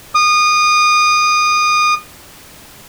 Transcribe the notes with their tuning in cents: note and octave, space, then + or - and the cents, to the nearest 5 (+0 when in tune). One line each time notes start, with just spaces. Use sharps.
D#6 -25